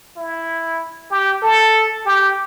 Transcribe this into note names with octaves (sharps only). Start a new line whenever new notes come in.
E4
G4
A4
G4